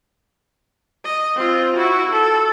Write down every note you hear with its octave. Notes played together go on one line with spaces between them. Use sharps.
D#5
C4 F4
E4 F#4
A4